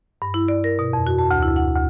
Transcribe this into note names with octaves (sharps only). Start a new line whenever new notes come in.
G2
E4
D5
A#4
B2
F2
F#4
A5
D2
E4
F#5
D2